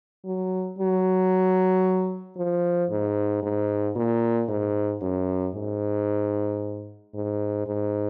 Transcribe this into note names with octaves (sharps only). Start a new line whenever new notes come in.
F#3
F#3
F3
G#2
G#2
A#2
G#2
F#2
G#2
G#2
G#2